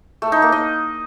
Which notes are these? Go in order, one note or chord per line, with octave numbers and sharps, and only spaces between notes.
A3
D#4
A#3
D#5